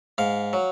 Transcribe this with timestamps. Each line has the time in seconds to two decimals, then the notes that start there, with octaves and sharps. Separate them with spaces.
0.18 G#2 F5
0.53 F#3